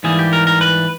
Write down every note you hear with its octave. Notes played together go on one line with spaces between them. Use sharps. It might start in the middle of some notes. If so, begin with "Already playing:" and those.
G#2 E3 G3 A#3 G#4
G4
A#4
A#4
B4